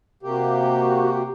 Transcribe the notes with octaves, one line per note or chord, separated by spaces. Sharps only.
C3 A#3 F#4 G4